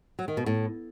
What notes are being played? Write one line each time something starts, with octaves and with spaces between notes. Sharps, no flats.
F#3
D#3
B2
A2